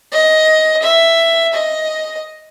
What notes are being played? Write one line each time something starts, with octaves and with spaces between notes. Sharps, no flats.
D#5
E5
D#5